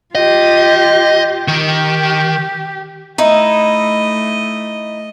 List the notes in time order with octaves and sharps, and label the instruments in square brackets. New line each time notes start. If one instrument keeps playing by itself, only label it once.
[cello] F4 G4 [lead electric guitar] D#5
[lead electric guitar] D#3 [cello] G4
[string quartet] A3 D#5 [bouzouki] D#4 E4